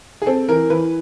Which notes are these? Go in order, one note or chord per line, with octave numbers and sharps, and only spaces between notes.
G#4
C4 A4
E3 A#4
E3 B4